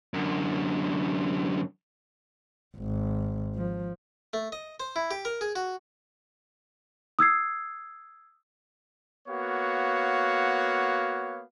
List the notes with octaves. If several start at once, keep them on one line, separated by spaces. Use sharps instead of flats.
F#2 D3
G#1
F3
A3
D#5
C5
E4
G4
A#4
G#4
F#4
D#6 E6 G#6 C7
A#3 B3 F#4 C#5 F5